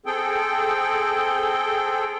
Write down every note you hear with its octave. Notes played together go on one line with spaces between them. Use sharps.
C4 G#4 A4 G5